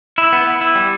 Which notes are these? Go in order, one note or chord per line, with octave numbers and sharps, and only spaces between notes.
E4
B3
B3
E4
G3